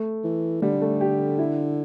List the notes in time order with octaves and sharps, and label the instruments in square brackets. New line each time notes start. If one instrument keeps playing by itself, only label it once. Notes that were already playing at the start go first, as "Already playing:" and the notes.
Already playing: [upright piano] A3
[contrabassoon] E3
[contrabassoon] D3 [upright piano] G3
[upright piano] A3
G4
E4